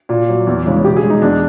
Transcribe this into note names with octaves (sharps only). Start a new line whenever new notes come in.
A#2
F#3
E2
C#3 E3 G#3
B2 G4
G#4
G#3
D#4
E2 D4